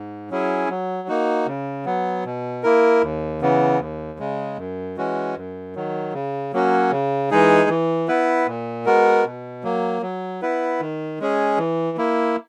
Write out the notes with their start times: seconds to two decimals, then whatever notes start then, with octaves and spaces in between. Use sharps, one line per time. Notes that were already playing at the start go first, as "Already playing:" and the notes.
Already playing: G#2
0.30 F#3 C#4 E4 G#4
0.69 F#3
1.08 A#3 D#4 F#4
1.46 C#3
1.85 F#3 B3
2.25 B2
2.63 A#3 E4 A#4
3.02 D#2
3.41 C#3 E3 B3
3.80 D#2
4.19 C#3 G#3
4.58 F#2
4.97 E3 G#3 C#4 F#4
5.36 F#2
5.75 D#3 F#3
6.13 C#3
6.53 F#3 A#3 C#4 F#4
6.91 C#3
7.31 E3 G#3 D#4 G#4
7.69 E3
8.08 B3 E4 B4
8.47 A#2
8.85 G#3 B3 F#4 A#4
9.25 B2
9.63 F#3 A#3
10.02 F#3
10.42 B3 E4 B4
10.80 D#3
11.20 G#3 C#4 G#4
11.58 E3
11.97 A#3 E4